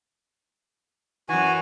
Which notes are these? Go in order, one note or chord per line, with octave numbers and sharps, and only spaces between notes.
F#2 E3 F#4 G#5